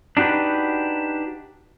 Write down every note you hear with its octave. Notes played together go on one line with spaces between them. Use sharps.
D4 D#4 F#4 G4 B4